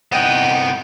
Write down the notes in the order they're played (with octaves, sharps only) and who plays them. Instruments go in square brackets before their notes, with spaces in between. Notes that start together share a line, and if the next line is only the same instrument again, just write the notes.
[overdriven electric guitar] C2 B3 [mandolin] D#5 F#5 [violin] G5